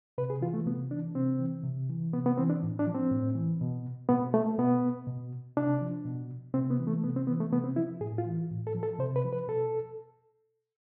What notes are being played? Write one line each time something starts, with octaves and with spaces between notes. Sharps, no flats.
C3 B4
G#4
E3 F4
A3
C3 B3
E3 D4
C3 C4
E3
C3
E3
C3 B3
B3
E3 C4
D4
A2
D4
F3
C4
A2
E3
B2
B2 B3
A3
B2 B3
B2
C3 D4
F3
B2
C3 C4
B3
E3
A3
C3 B3
C4
E3 B3
A3
C3 B3
C4
F3 E4
A2 G#4
F4
E3
A2
A4
F3
A4
C3 C5
B4
F3
B4
B2 A4